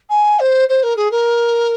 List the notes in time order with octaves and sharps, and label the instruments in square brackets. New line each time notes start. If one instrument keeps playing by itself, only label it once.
[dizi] G#5
C5
C5
A#4
G#4
A#4